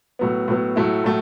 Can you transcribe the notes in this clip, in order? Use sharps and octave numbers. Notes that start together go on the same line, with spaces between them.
A2 F#3 B3
A2 F#3 B3
A2 F#3 A3 E4
A2 F#3 A3